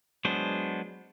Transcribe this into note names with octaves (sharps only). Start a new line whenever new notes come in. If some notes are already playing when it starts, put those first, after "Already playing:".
F#3 G#3 B3 D4 C5